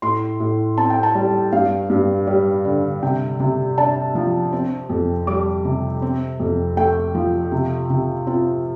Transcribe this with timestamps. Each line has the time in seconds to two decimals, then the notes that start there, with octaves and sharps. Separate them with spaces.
0.02 A2 C6
0.40 A2
0.78 C4 A5
0.90 G5
1.03 A5
1.15 G3
1.52 G2 F5
1.90 G2
2.27 G3
2.65 D3
3.03 C3 G5
3.40 C3
3.78 D4 A5
4.15 F3
4.53 C4
4.89 F2
5.27 G3 D6
5.65 C3
6.02 C4
6.40 F2
6.77 A3 G5
7.15 F3
7.52 C3
7.90 C3
8.27 C4 F4